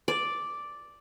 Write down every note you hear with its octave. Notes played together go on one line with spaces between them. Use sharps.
D5